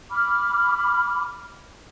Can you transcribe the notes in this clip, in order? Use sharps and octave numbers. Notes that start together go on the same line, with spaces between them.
B5 D6 F6